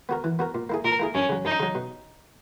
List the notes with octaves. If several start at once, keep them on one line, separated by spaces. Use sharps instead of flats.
B3 F#4 A#4
E3
B3 F#4 A#4
A#2
A#3 E4 G#4
A#2 A#4
A#3 E4 G#4
F#2 C#4
C#3 F#3
F#2 D#4
C#3 F#3
B2